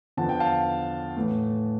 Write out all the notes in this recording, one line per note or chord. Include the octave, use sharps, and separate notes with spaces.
E2 D3 F3 A5
G5
F5 A5
A2 E3 A3